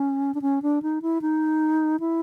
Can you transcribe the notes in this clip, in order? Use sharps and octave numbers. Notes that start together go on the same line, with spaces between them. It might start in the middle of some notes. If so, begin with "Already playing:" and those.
Already playing: C#4
D4
C#4
D4
D#4
E4
D#4
E4